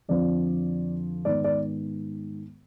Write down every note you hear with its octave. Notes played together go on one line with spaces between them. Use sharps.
F2 D3 F3 C4 D5
G#2 D#3 B3 D5
D5